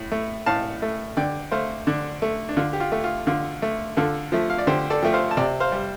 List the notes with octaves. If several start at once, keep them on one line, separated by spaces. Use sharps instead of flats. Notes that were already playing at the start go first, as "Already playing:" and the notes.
Already playing: A2
A3
A2 F5 A5
A3
D3 D5 G5
A3 C5 F5
D3 D4
A3
D4
D3 F4
G4
F4
A3
F4
D3 F4
A3
D3 F4 A4
F3 A3
F5
D5
D3 G4 C5
A4 D5
F3 A3 G5
C5 F5
A5
C3 D5 G5
C5 F5
G3